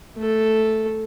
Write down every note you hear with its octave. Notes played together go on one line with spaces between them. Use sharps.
A3 A4